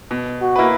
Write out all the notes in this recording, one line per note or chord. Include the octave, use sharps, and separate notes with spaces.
B2
F#4
A#3 E4 B4